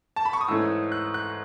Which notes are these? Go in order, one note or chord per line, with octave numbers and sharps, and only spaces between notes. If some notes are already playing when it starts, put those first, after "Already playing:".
A5
B5
C#6
D#6
G#2 E3 A3 C#4 E6
F#6
F#6